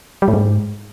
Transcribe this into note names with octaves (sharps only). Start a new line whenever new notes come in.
G3
A2
G#2